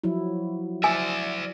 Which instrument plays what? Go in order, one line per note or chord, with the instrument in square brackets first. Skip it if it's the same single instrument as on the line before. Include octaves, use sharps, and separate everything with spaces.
[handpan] F3 F#3 E4
[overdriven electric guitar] D5 E5 [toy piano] G#5